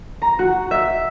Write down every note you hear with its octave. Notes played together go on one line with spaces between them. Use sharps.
A#5
F#4
E5